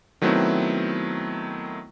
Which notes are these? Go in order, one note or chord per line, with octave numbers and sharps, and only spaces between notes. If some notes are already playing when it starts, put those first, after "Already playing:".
D#3 F#3 A3 B3 C4 E4